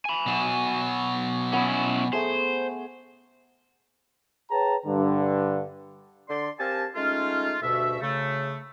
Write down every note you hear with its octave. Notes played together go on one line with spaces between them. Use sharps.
G#5 B5
B2 F#3
B3 C#4 E4 G#5
A3 G#4 C5
G#4 B4 C#5 G5 A5 A#5
G2 D3
D3 D5 C6
C4 G4 A#4 F5 G#5 A5
G#3 A3 C#4 D#4 F4
D2 G2 B2 F#4 E5
C#3 A3